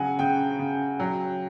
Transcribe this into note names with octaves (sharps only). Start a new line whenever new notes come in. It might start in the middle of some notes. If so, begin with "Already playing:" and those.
Already playing: C#3 F#3 F#5 G#5
C#3 G5
C#3
F#3